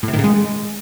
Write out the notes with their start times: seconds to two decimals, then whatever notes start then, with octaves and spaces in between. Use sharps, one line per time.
0.03 A2
0.08 C3
0.13 D#3
0.19 C#3
0.24 G#3